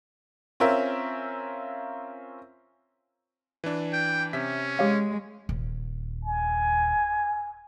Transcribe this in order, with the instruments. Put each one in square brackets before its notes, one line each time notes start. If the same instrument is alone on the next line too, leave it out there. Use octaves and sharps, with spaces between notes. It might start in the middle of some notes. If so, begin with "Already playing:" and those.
[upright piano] C4 C#4 F4 A#4 E5
[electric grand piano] E3 D4
[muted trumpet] G5
[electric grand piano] C3 E5 B6 [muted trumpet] C#4
[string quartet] G#3 [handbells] G4 C#5 F5
[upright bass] D#1
[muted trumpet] G#5